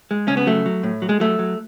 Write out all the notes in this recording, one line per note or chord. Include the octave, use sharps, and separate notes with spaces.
G#3
C#3 C#4
B3
F#3 A3
F#3
A2
F#3
G#3
F#3 A3
F#3